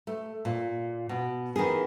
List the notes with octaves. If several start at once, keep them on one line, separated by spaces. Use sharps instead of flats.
A3
A#2
B2
D#3 E3 B3 G#4